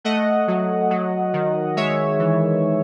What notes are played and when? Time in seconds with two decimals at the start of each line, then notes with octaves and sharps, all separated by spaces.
0.04 A3 D#5 F#5
0.48 F#3
0.91 F#3
1.33 D#3
1.77 G#3 C#5 E5
2.19 E3